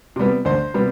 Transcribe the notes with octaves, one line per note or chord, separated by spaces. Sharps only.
C3 G3 B3
D2 C5
C3 G3 B3